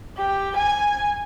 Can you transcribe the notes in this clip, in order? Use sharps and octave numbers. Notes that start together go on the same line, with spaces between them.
G4
G#5